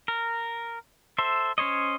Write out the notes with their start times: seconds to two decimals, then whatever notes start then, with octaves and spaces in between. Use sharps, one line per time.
0.08 A#4
1.18 A4 C5 E5
1.58 C#4 C5 C#5 D#5